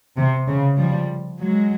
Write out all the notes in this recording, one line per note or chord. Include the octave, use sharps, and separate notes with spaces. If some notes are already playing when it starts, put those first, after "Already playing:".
C3
C#3
F3 G3
F#3 G#3